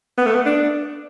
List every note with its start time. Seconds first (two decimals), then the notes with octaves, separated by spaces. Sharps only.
0.18 B3
0.27 A3
0.35 B3
0.46 D4